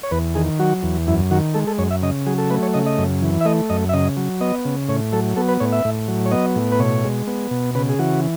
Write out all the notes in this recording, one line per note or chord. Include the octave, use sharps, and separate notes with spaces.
C#5
E2 B4
D#3 G#4
F#3 F#4
E2
F#2 E4
D#3 F#4
G#3 A4
A4
F#2 C#5
E5
C#3 D#5
F#3 G#4
A4
A3 B4
C#5
C#3 D#5
D#5
F#2
E3
E5
A3 D#5
F#2 D#5
E5
C#3 D#5
F#3
B3 D#5
C#3
A2 C#5
F#3 A4
B3 A4
B4
A2 C#5
E5
A2
F#3
C#5
B3 D#5
A2
B4
B2 C#5
G#3
B3
B2
C#3 B4
G#4
E3 F#4